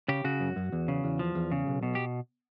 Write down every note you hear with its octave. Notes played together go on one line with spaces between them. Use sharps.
C#3 G4
C#3 F#4
F#2
F#2
E2
C#3
E2
F3
E2
C#3
B1
B2
G4